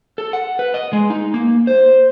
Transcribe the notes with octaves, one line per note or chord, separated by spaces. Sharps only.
A4
F#5
B4
D#5
G#3
D#4
A#3
C5